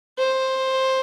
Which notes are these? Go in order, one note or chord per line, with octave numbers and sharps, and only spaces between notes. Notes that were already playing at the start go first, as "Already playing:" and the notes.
C5